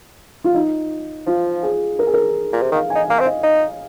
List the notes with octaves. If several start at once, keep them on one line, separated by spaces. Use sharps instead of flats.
F4
D#4
F3 F4
G#4
A#4
G#4
A#4
A#2
C3
D#3 F5
D#4 G#5
A#3 F5
C4
D#5
D#4